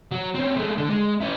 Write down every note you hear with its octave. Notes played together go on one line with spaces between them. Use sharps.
F#3
C4 C#4
G#3 A3
D3
G#3
C#4 E4